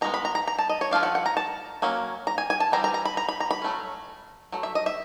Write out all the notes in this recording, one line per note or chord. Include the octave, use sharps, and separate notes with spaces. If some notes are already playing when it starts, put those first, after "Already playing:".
D#3 G#3 B3 A#5
B5
A#5
A#5
A#5
A5
D#5
C#5
F3 A3 D4 F5
F#5
F#5
A#5
A5
F#3 A#3 C#4
A#5
G#5
G#5
A5
E3 G3 C4 A#5
A#5
A#5
B5
A#5
B5
A#5
B5
F#3 A3 C#4
F#3 A3
E5
D#5
E5